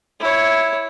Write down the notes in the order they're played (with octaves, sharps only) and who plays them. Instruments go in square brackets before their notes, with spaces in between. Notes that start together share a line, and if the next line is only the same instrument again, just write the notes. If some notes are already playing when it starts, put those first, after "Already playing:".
[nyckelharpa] E4 C#5